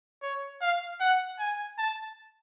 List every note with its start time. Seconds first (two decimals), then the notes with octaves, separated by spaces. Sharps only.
0.22 C#5
0.61 F5
1.00 F#5
1.39 G#5
1.78 A5